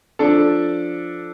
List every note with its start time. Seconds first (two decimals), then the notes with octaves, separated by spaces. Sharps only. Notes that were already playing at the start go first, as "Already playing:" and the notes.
0.19 F3 D4 A4